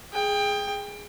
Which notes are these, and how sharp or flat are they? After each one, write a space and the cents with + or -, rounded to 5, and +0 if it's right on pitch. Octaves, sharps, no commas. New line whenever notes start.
G#4 +0 G5 +20